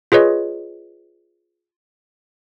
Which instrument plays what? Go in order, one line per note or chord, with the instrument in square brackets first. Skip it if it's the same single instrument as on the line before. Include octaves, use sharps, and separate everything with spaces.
[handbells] F4 G#4 B4 C#5 D#5